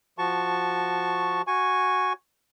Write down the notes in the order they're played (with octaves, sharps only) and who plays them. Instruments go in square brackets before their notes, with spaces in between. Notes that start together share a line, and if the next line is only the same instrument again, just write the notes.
[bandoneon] F3 F#4 A5 C#6
F#4 G#5 C#6